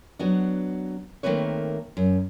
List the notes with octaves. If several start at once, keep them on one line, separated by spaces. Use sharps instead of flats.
F#3 B3 D4
D#3 A3 A#3 C4 B4 C#5
F#2